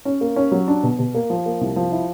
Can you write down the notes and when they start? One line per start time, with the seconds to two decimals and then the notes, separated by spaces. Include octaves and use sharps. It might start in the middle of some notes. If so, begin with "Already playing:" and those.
0.05 C#4
0.21 A#3
0.36 C#4
0.52 F#3
0.68 D4
0.83 B2
0.99 B2
1.15 A#3
1.30 F3
1.46 A#3
1.61 C2
1.76 F3
1.92 E4